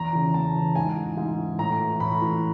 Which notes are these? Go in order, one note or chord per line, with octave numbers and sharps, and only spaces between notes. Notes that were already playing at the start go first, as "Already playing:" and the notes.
Already playing: E2 A#5
C#3 E3
E2 A5
C#3 E3
G#2 G#5
E3
G#2
E3
A2 A#5
E3
A2 B5
E3